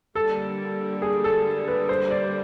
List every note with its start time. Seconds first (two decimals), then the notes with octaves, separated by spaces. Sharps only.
0.15 D3 G3 A#3 A4
1.02 G#4
1.24 A4
1.68 B4
1.89 C5
2.10 D5